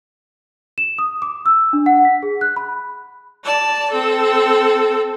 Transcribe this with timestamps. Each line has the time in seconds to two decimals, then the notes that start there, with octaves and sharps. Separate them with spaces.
0.78 E7
0.98 D#6
1.22 D6
1.46 E6
1.73 D4
1.86 F#5
2.05 B6
2.23 G#4
2.41 F#6
2.56 B5
3.44 D5 A5
3.90 C4 A4